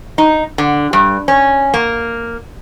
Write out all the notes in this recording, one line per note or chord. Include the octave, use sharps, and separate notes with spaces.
D#4
D3
G2
C#4
A#3